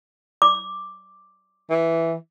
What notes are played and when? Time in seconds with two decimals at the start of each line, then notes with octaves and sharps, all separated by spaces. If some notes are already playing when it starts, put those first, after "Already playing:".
0.42 D6
1.70 E3